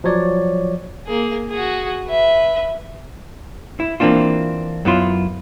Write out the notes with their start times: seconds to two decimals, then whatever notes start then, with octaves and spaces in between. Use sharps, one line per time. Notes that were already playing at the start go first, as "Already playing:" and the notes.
0.04 F3 F#3 C#5 D5
1.07 A#3 G#4
1.50 F#4 G#4
2.07 B4 E5
3.80 E4
4.00 E3 A#3 C4 D4 F4
4.85 F#2 B3 E4 F4 C6